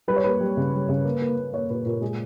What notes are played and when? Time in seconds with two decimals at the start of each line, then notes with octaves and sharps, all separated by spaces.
0.08 G3 B4
0.16 C#5
0.24 A#3 B4
0.41 G3
0.57 C#3
0.73 G3
0.89 C#3
1.04 A#3
1.21 A#3
1.37 A#3
1.53 A#3 C#5
1.70 A#2 B4
1.85 A#2 A#4
2.01 G#3 G#4